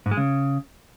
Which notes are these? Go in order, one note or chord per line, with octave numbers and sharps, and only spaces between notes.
G#2
G#3
C#3